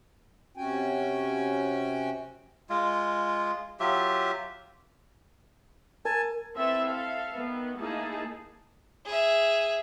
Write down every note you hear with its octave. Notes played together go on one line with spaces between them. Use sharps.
C3 C#4 F#4 G5 G#5
G#3 F4
F#3 F4 G4 E5
A#4 G#5 A5
C4 E4 A4 B4 E5
A4 E5 F5
D#3 B3
A3 A#3 D#4 E4 G#4 A5
G#4 E5